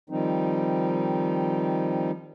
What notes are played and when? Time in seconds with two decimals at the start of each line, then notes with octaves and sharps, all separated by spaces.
0.10 D#3 F3 G3 C4 D#4